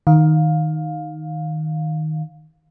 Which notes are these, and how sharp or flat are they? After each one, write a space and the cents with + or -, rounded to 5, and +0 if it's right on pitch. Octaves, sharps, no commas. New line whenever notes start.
D#3 +0 F5 +15